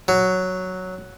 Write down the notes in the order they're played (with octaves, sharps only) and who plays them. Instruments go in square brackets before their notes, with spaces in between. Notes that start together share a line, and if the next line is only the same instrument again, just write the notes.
[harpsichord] F#3